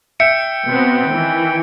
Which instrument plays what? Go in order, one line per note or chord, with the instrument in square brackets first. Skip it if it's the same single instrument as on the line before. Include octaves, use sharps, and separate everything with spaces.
[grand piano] E5 [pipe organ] G5 [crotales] C#7
[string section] B2 B3 C4
D#3 E3